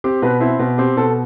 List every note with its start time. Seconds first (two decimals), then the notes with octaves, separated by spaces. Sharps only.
0.04 C4 G4
0.22 B2 B4
0.40 C4 E4
0.59 B2
0.78 C4 G4
0.97 B2 A4